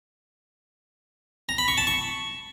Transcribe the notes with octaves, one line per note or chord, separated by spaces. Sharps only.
A#5
B5
C#6
A5
C#6